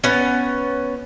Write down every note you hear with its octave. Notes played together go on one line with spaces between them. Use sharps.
B3 C#4